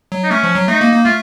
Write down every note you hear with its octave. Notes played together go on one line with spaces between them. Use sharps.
F#3
D#4
A3 C#4
F3
F#3
A3 D#4
A#3
A#3
A3 F4